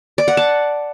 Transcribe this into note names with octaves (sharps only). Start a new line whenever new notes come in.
D5
F#5
A5